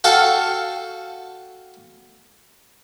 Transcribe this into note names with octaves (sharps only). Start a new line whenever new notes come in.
F#4 A4 F5 G5 A5